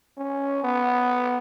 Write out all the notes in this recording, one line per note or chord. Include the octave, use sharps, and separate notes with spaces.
C#4
B3